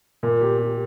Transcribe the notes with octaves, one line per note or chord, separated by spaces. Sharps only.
A#2
G4
G4